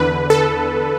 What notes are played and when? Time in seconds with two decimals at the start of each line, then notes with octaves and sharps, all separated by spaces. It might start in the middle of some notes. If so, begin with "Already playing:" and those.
Already playing: E2 D3 B4
0.30 A4